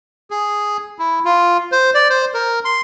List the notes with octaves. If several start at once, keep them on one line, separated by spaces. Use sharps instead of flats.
G#4
E4
F4
C5
D5
C5
A#4
C6